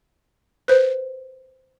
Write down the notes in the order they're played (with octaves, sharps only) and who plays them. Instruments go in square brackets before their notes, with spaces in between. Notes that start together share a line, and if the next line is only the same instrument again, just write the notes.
[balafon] B4 C5